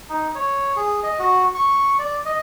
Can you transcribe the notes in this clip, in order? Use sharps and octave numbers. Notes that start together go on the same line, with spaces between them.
D#4
C#5
G#4
D#5
F#4
C#6
D5
D#5